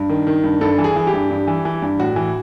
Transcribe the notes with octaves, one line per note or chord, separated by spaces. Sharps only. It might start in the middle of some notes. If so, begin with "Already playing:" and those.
Already playing: G2
D#3
D#3
G2
G2 A4
E3
G#4
E3
G4
G2
G2
E3
E3
G2
A2 F#4
E3